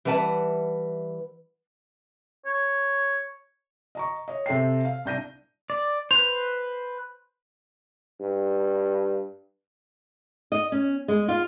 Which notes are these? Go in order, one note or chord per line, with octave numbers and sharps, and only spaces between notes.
E3 G3 B4 F#5 A5
C#5
D#5 A#5 C#6
C#5 D#5
C3 A4 E5 G5 C7
F5
C2 D4 G6 A#6 D#7
D5
B4 C5 F7
G2
D#5
C#4
G#3
F4